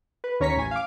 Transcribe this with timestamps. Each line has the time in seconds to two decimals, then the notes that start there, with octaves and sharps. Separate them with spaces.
0.24 B4
0.40 D#2 C#4 C#5 A#5 C#6 B6
0.57 A1 G#5
0.71 F5 D6